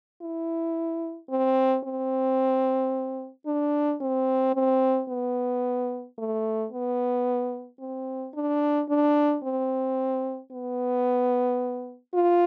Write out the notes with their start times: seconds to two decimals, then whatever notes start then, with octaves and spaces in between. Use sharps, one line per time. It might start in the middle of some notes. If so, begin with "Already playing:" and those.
0.22 E4
1.30 C4
1.84 C4
3.46 D4
4.01 C4
4.55 C4
5.09 B3
6.18 A3
6.72 B3
7.80 C4
8.34 D4
8.89 D4
9.43 C4
10.51 B3
12.14 F4